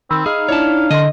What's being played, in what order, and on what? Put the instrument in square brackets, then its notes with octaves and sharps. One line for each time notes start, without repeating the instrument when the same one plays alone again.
[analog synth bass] D#3 [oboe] C4 [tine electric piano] B5 E6
[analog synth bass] D#4 [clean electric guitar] G#4 [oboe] F5
[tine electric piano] D4 E4 D5 [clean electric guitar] C#5 A5
[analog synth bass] D3 [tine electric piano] D4 C6 [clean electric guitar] D#5